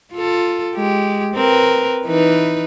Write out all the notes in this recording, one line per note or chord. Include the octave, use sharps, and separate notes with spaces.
F4 A4
G#3 G4
C4 A#4 B4
E3 D#4 B4